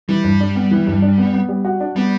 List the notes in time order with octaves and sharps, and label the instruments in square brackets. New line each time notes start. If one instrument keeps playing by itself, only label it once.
[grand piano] E3 [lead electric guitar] G3
[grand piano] G2
D4
B3
E3
G2
D4
B3
B3
G3
F#4
D4
[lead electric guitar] G3 [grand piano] B3